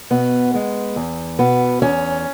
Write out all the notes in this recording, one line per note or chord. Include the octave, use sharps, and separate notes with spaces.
B2 B3
G#3 B3
E2
B2 B3
E2 C#4